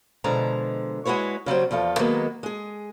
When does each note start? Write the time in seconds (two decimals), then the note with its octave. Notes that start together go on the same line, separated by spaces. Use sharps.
0.24 B2 D3 F3 G#3 A#5
1.05 G#3 E4 F#4 B4 C#5
1.46 C#3 F#3 G3 C4
1.71 E2 F3 F4 A4
1.99 D#3 F#3 G#3 A#3 B3
2.43 G#3 G#4